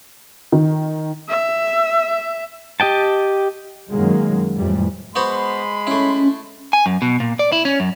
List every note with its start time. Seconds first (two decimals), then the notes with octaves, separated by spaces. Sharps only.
0.52 D#3
1.29 E5
2.80 G4 D#5 G5 A5
3.91 F#2 D#3 F#3 G#3 A#3
4.56 F2 A2 E3 G3
5.16 G#3 B3 F#4 C5 B5 C6
5.87 A3 C#4 E4
6.73 G#5
6.86 F#2
7.02 B2
7.20 A#2
7.39 D5
7.52 E4
7.65 C#4
7.80 F#2